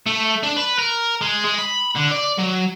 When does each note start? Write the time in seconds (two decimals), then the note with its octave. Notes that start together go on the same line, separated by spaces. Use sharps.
0.06 A3
0.43 D4
0.57 B4
0.79 A#4
1.21 G#3
1.45 G#3
1.58 B5
1.95 D3
2.11 D5
2.39 F#3